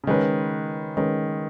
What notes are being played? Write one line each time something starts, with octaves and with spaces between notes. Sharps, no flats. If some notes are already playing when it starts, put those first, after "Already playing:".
C#3
D#3 G#3 C#4 B4
D#3 G#3 C#4 B4